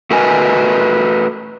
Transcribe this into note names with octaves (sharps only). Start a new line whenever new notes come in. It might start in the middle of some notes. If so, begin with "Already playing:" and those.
A3 F#4 A#4 B4 D#5 G#5